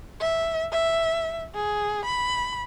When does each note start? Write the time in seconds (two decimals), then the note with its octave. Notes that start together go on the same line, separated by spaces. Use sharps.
0.20 E5
0.71 E5
1.55 G#4
2.05 B5